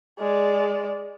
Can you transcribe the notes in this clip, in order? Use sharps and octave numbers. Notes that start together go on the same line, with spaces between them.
G#3 D5